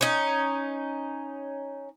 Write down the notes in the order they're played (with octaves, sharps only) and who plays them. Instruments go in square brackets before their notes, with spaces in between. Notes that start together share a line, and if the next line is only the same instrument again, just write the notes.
[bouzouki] C#4 D#4